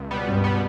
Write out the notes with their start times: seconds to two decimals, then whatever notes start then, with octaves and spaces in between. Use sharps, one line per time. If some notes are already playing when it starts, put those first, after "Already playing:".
Already playing: C#2
0.11 B2 G3 B3
0.26 C#2 G2
0.44 B2 G3 B3